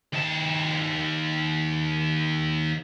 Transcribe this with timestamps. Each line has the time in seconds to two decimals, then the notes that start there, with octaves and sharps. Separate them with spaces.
0.13 D#2 A5